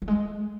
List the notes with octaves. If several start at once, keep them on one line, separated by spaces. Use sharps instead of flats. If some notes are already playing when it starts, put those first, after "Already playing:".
F#3
G#3